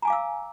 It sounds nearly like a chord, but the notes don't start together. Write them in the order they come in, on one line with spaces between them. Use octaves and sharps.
A#5 G#5 D6 F5 E6